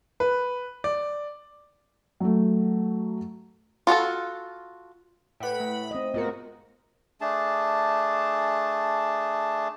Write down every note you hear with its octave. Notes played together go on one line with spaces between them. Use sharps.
B4
D5
F#3 A3
F4 F#4 G#4 A4
A2 B4 F#5 G5 B5
A3
C4 D#5
G#2 B3 F4 F#4 A#4
A3 D4 G#4 A5